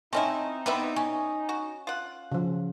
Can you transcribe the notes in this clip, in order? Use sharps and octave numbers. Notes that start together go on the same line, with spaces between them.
A3 C4 C#4 D#4 E4 D#5 E5
G3 B3 C4 E4 B4 E5
C#4
F#4
F4 F#5
C#3 F3